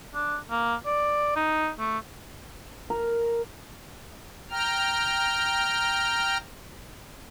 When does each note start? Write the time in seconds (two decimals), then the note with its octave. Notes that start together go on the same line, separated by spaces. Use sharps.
0.15 D4
0.51 A#3
0.86 D5
1.36 D#4
1.79 A3
2.90 A#4
4.51 G5 A#5 F6